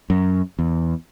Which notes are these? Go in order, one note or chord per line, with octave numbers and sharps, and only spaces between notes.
F#2
E2